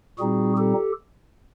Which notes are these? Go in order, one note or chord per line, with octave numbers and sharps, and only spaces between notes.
A#2 G3 C4 D#4 F#4 G#4
G4 A4